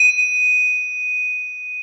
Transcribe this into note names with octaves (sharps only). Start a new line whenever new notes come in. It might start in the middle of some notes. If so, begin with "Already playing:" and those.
Already playing: D#7